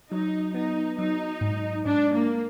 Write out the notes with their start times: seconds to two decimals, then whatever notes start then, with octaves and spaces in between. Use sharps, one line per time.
0.11 F#3 D#4
0.54 B3 D#4
0.98 F#3 D#4
1.41 G#2
1.85 G#2 D4
2.13 A#3